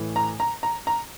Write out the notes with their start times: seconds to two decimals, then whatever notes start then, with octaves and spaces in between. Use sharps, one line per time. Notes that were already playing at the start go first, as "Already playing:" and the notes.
Already playing: A2 E3
0.16 A#5
0.40 A#5
0.63 A#5
0.87 A#5